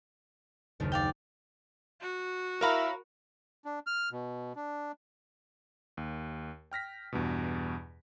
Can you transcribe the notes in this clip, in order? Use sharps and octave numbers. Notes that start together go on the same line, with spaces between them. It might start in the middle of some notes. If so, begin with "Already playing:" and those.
F#1 D#2 D4
D5 F5 G5
F#4
E4 A#4 C#5 F5 A#5 B5
D4
F6
B2
D4
D#2
G5 F6 A#6 B6
E2 G2 B2